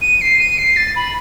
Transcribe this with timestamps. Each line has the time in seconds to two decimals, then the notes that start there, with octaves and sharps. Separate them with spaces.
0.01 D#7
0.21 C7
0.39 D#7
0.58 C7
0.76 A6
0.96 B5